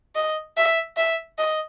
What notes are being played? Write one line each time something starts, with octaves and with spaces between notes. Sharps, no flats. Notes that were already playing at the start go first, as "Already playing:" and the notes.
D#5
E5
E5
D#5